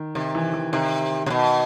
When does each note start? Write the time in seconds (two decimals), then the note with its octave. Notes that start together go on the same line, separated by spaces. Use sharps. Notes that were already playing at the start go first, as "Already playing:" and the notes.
Already playing: D#3
0.15 C3 D#3
0.35 E3
0.53 E3
0.72 C3 D#3
1.26 C3
1.30 B2